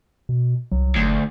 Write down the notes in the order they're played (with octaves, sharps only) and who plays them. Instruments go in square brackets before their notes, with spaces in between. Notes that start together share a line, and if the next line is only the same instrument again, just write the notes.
[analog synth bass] B2
[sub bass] C2 [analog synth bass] F#3
[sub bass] F#1 [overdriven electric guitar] D2